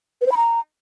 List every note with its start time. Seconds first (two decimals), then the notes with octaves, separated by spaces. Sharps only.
0.21 B4
0.26 C5
0.31 B5
0.37 A#5